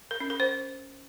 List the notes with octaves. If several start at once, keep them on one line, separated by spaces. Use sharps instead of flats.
A#4
C#4
A#4
C5